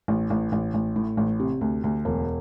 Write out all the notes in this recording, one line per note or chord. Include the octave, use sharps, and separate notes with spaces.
A1
A1
A1
A1
A2
A1
C3
D2
D2
E1